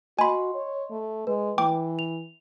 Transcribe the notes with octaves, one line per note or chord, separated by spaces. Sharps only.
F#4 D#5 G#5 B5 C6
C#5
A3
G#3 B4
E3 G5 D6
F7